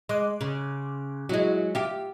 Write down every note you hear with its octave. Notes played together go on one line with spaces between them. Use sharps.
G#3 C6 D6 F#6
C#3
F#3 G#3 E4 F#4
F4 G4 E5